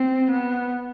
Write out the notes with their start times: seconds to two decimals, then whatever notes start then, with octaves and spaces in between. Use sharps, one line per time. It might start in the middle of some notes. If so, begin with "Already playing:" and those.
Already playing: C4
0.31 B3